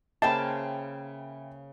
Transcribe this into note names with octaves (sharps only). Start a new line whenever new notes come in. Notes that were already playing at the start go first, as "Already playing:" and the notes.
C#3 A#3 C5 E5 G5 A5 B5